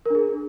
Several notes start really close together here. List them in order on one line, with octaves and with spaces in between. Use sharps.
A#4 D4 G#4